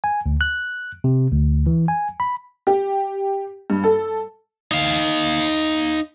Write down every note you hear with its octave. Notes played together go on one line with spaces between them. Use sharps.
G#5
D2
F#6
C3
D2
E3
G#5
B5
G4
G2
A4
D#4 F5